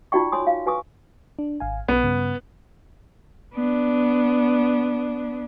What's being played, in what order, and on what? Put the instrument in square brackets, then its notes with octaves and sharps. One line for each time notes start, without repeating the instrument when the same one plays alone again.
[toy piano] D#4 F4 F#4 D5 G5 C#6
C#5 G5 G#5 C6 D#6
F5
F#4 B4 G#5 C#6 D#6
[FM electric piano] D4
G#1 F5 G#5
[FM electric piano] B1 [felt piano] B3
[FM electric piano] G2 C#3
[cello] B3 D4